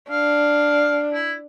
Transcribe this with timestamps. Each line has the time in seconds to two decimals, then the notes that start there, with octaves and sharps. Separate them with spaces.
0.10 D4 F5
1.13 E4